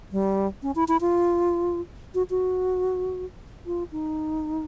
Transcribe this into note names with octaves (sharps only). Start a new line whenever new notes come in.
G3
C#4
E4
E4
F4
F#4
F#4
F4
D#4